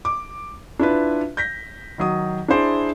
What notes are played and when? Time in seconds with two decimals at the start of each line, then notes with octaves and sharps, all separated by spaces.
0.05 D6
0.79 D4 E4 F4 B4
1.37 G6 A#6 B6
1.98 D#3 F#3 D#6
2.48 D4 E4 G#4 C5 D5